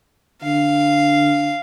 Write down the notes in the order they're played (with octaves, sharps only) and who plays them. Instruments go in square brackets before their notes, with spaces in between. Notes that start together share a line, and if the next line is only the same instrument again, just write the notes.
[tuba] D3 [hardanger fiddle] F5